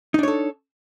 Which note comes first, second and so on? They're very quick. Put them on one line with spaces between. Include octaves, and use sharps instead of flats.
D#4 D4 C#5 A4